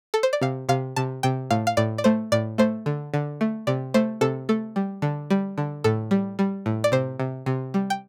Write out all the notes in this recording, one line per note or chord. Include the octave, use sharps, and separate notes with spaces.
A4
C5
D5
C3 F5
C3 F5
C3 A5
C3 G5
A2 F5
F5
A2 D5
D5
A3 C5
A2 D5
A3 C5
D3
D3
A3
C3 D5
A3 C5
C3 A4
A3 A4
G3
D3
G3
D3
A2 A4
G3
G3
A2
D5
C3 C5
C3
C3
G3
G5